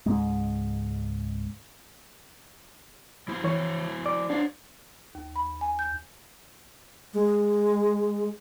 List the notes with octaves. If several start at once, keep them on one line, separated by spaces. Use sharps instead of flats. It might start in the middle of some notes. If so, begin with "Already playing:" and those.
C#2 G#2 G#3
F3 E4 C5
E3 C#5
D5 D6
D4 C5 C#5 F5
D#2
B5
G#5
G6
G#3